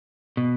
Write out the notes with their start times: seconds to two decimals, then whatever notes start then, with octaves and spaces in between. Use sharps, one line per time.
0.37 B2